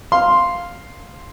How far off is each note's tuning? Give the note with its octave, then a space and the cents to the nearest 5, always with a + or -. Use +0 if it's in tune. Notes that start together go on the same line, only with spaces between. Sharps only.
F5 +0 C6 +0